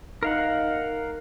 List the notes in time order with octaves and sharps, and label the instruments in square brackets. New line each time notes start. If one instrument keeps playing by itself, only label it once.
[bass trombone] D#4 [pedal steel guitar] A#4 F5 F#5